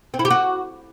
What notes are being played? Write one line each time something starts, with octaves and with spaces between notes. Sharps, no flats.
C4
E4
G4
F#4